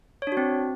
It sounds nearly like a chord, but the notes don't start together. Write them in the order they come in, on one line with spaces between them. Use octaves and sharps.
C#5 D4 F#4 C4